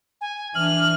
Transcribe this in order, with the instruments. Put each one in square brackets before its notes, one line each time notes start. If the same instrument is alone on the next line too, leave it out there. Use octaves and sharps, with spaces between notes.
[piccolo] G#5
[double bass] E3 D4 [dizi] F6 [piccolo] F#7